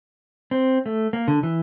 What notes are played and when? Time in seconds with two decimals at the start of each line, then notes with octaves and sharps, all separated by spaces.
0.51 C4
0.86 A3
1.13 A#3
1.28 D3
1.43 E3